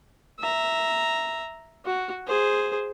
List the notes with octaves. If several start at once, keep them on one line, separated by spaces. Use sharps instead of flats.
E5 A#5
F#4
G#4 C5